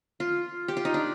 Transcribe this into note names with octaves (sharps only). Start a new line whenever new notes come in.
F4
G4
F4
D#4
D4